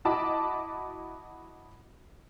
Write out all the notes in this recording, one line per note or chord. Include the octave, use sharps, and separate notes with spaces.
E4 F#4 D#5 A5 B5 D6